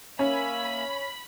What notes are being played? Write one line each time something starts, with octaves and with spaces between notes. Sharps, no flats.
A#3 C#4 E5 G#5 B5